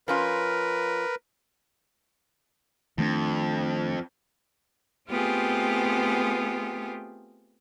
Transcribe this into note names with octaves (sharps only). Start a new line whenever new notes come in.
F3 C#4 F4 A#4 B4
F2 D#3 A3 D4
A3 B3 C4 F4 G4 G#4